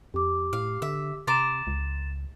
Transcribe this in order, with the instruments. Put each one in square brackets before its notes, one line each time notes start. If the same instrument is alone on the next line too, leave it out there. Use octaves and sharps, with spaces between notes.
[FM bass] F2 [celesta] G4 D6
[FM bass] A2 [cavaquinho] F5
[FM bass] D3 [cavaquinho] E5
[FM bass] C3 [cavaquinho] A#5 C6 D6 [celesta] A6 E7
[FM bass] C#2